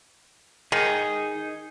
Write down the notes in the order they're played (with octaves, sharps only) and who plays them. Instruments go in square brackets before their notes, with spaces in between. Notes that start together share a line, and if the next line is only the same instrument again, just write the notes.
[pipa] D#3 [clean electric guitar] D#4 G#4